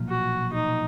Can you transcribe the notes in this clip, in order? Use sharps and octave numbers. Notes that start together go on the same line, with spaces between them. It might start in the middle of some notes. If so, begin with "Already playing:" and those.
Already playing: B1 A#2 F3
F#4
D#4